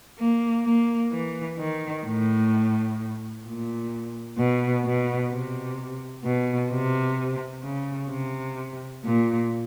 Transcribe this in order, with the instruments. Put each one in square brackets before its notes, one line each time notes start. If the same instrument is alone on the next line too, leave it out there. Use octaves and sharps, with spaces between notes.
[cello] A#3
A#3
E3
D#3
A2
A#2
B2
B2
C3
B2
C3
C#3
C3
A#2